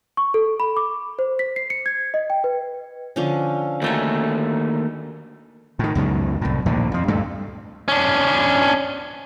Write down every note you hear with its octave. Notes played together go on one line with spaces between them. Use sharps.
C#6
A4
B5
D6
C5
B6
C7
C#7
G#6
D#5
G5
B4
D3 F3 C#4
D#2 A3 F#4 G5 G#5
A2 D#3
C#2 F#2 B2 D#3
C2 A2
A#1 D#2 A2 D3
F2 F3
D2 G2 A3
C#4 D4